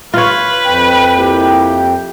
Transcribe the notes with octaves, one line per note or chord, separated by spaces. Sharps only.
F4 B4 C#5
F2 G5
A#3 E4 G4